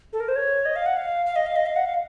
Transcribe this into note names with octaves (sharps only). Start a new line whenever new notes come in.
A4
A#4
C5
C#5
D#5
F5
F#5
F5
F5
D#5
F5
D#5
F5
F#5
F5